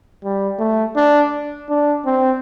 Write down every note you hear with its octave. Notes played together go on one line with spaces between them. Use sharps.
G3
A3
D4
D4
C4